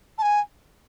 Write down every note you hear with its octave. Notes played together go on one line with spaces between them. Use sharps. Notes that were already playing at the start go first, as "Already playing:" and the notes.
A5
G#5